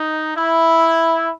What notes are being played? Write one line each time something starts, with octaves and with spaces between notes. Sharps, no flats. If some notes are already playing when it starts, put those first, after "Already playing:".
Already playing: D#4
E4